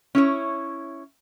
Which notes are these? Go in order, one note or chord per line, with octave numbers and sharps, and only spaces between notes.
C#4 E4 C#5